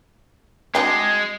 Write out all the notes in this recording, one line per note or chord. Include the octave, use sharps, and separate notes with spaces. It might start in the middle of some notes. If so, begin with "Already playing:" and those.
G#3 C4 D4 F#4